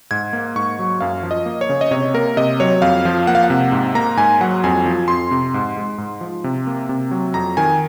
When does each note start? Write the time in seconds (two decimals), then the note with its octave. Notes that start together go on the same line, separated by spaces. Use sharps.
0.11 G#2 G#6
0.33 A#3
0.55 G#2 C#6
0.79 F#3
1.01 F#2 F5
1.23 F3
1.31 D#5
1.46 A#3
1.61 C#5
1.69 C#3
1.81 D#5
1.91 C3 C#5
2.14 A#3 A#4
2.37 C3 D#5
2.60 F#3 C#5
2.82 F2 F5
3.05 F3
3.27 A#3 F#5
3.35 F5
3.43 F#5
3.50 C3
3.72 G#2
3.95 A#3 A#5
4.17 G#2 G#5
4.41 F#3 F#5
4.64 F2 G#5
4.86 F3
5.08 F2 C6
5.31 C3
5.54 G#2
5.76 G#3
5.98 G#2
6.21 F3
6.44 C3
6.67 A#3
6.89 C3
7.11 F#3
7.34 F2 A#5
7.57 D#3 G#5